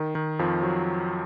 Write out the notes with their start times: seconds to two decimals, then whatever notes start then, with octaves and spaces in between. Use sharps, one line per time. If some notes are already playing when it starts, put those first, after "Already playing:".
Already playing: D#3
0.15 D#3
0.39 F2 F3
0.63 F#3